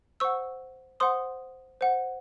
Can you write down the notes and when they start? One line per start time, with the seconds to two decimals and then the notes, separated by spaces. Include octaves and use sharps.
0.20 C5 F#5 C#6 E6
1.00 C5 F#5 C6 D#6
1.81 C5 F#5